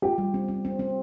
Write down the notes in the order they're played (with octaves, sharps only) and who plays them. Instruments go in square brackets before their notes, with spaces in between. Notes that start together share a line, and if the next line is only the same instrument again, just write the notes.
[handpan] F4 [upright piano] G4
[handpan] G3
C4
C4
C4
C4